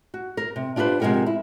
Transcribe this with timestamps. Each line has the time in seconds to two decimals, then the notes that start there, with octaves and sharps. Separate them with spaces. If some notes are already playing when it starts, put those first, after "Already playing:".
0.14 F#4
0.37 A#4
0.56 C3
0.76 D4 F4 G4 G#4 B4 C5
1.00 C3 F3 G#3 A#4 F#5 G5
1.26 E4